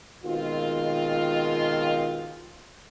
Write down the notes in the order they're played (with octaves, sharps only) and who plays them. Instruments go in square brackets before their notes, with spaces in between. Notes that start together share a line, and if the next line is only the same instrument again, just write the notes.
[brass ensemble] B2 D#3 G#3 C4 F4